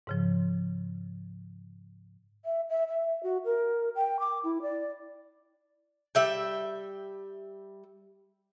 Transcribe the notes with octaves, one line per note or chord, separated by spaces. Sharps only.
G#2 C#3 F3
E5
E5
E5
F#4
A#4
G5
D6
E4
D5
G3 E5 G5